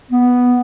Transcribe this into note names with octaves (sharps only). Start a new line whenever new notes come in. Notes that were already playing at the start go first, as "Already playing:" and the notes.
B3